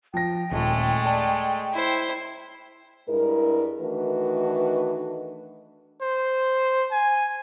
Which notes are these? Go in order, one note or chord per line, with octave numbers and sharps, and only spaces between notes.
F3 G5 A#6
D#1 G#3 A3
D5 A5
E4 C5
G2 G#3 E4 A#4
D#3 E3 A3 D4 F#4 B4
C5
G#5